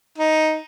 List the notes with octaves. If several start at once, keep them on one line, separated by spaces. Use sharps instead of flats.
D#4